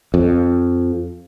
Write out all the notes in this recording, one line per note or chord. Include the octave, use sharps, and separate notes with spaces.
F2